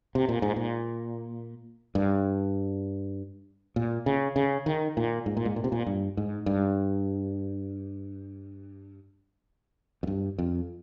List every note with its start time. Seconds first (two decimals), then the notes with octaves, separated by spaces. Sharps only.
0.15 C3
0.29 A#2
0.42 G#2
0.56 A#2
1.95 G2
3.76 A#2
4.06 C#3
4.36 C#3
4.66 D#3
4.97 A#2
5.26 G#2
5.37 A#2
5.45 G#2
5.56 A#2
5.64 C3
5.72 A#2
5.86 G2
6.17 G#2
6.46 G2
10.03 F2
10.07 G2
10.38 F2